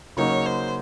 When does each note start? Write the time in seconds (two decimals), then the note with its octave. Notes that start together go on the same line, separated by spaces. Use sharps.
0.17 C#3 F#3 A#3 D#4 C#5
0.46 C5